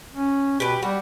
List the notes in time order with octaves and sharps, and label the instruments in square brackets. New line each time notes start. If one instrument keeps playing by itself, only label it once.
[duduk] C#4
[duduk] B2 [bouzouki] G4 B4
[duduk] G3 [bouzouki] F#4